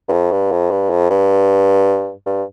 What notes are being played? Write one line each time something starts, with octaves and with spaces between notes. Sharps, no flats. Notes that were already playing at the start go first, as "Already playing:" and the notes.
G2
F2
G2
F2
G2
F2
G2
G2